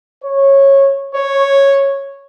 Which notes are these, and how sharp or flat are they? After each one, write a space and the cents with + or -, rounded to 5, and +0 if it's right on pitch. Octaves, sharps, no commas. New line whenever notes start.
C#5 -15
C#5 -5